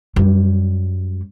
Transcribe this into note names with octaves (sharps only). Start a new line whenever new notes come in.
F#2 G3